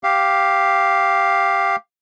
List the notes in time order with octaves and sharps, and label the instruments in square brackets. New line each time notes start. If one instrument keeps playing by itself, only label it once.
[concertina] G4 F5